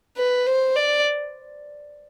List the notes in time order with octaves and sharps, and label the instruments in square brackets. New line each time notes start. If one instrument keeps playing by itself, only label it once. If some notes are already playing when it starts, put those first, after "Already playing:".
[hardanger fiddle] B4
C5
D5